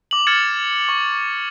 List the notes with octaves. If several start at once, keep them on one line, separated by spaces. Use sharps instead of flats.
D6 F#7
F6 G#6 A6 C#7 E7
C#6